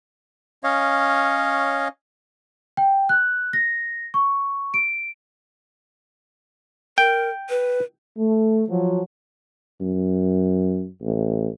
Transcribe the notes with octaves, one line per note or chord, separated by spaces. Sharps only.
C#4 C#5 D#5 F5
G5
F#6
A#6
C#6
D7
A#4 G5
B4
A3
F3 F#3
F#2
A1